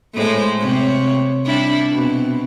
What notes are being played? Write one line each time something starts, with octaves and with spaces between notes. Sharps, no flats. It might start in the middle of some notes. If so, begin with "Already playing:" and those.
A2 G#3 C5
C3 C#5
G3 D4 E4
B2 C4